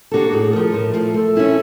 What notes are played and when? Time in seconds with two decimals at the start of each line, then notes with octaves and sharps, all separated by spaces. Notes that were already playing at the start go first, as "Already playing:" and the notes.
0.11 A#3 D4 F#4 G4 A4
0.29 G4
0.33 A2 G#4
0.53 F3 A3 A#4
0.74 A2
0.94 F3 A3
1.14 A3 A4
1.36 C#4 E4 G#4